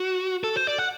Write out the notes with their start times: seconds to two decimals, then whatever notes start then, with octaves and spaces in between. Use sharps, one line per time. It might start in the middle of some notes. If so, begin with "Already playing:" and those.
Already playing: F#4
0.44 A4
0.56 C5
0.67 D5
0.78 F#5